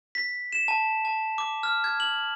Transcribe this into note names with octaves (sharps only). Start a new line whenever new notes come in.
B6
E7
A5
A5
D6
F6
G#6
F#7